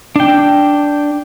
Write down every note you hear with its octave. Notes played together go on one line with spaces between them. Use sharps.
D4 G5